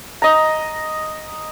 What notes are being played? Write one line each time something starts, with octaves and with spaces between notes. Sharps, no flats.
D#5 A#5